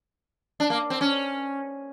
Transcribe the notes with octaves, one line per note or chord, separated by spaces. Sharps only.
D4
A#3
C4
C#4